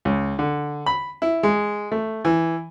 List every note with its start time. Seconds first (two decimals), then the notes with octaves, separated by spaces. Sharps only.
0.05 C#2
0.39 D3
0.86 B5
1.22 E4
1.43 G#3
1.92 A3
2.25 E3